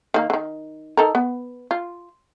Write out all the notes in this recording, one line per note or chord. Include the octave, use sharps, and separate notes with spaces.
D#3 A#3
D3 D#3
D#4 A4 A#4
B3
F4